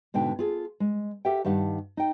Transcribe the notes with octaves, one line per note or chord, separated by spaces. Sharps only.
G#2 B2 D3 G5
F4 G#4 A4
G#3
G4 A4 A#4 E5 F#5 G5
G2 D#3 G4 F5 F#5 A5
D#4 G5